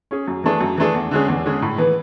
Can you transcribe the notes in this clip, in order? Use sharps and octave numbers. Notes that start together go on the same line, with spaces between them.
C#4 G#4
F#2
E3 A3 D4 G#4
F#2
E3 A3 D4 G#4
E2
D3 G#3 C#4 G#4
E2
D3 G#3 C#4 G#4
A2
E3 B3